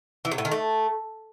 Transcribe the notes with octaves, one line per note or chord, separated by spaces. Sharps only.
E3
C3
A2
D#3
A3